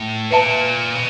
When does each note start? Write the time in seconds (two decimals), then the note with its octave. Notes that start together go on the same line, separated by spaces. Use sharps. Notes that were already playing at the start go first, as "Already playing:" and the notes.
Already playing: A2
0.30 A#2 B4 E5 A5
0.95 B2